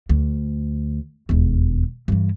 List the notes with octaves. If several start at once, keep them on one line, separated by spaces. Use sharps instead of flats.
D2
E1 D#2
G2 E3